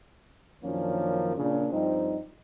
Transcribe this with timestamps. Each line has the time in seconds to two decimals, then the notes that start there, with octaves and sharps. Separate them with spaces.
0.63 F#2 D#3 F3 A#3 C#4 D4
1.37 A#2 C#3 D4
1.71 G2 F3 G3 C4 D#4